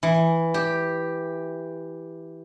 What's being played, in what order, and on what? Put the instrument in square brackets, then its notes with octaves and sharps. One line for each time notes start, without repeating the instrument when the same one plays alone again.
[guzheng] E3
G4